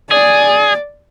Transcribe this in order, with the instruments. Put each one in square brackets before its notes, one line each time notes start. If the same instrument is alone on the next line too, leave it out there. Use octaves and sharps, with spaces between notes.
[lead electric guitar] G#4 [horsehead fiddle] D5